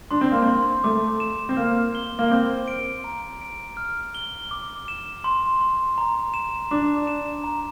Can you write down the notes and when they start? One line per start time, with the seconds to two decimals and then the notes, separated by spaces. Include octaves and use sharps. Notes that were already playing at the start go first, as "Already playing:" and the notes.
0.11 D4 C6
0.21 C4
0.32 A#3
0.42 C4
0.48 C6
0.84 A3 D6
1.20 E7
1.49 C4
1.57 A#3 F6
1.95 G7
2.19 A#3
2.31 C4 D6
2.68 D7
3.04 A#5
3.41 D7
3.77 F6
4.15 G7
4.51 D6
4.88 E7
5.24 C6
5.61 C6
5.98 A#5
6.34 E7
6.71 D4 D6
7.07 E7
7.44 A#5